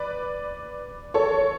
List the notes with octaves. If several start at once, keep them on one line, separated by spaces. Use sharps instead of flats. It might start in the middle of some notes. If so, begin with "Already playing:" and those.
Already playing: B4 D5
A4 C#5